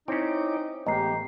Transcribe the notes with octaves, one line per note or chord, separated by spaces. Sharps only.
C4 C#4 D#4 E4 C#5 D6
A1 G#3 B3 G4 D#5 A#5 C7